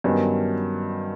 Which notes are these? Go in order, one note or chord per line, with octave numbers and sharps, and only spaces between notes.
G2 D#3 F#3 B3 C#4